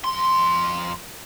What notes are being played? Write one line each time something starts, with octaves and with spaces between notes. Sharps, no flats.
F2 C6